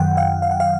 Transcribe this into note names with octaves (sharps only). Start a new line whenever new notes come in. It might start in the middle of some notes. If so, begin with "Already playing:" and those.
Already playing: F#2 D#3 F#3 F#5 G5
F5
F5
F#5
F5